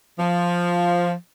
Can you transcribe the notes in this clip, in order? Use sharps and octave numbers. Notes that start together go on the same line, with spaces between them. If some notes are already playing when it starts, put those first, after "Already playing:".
F3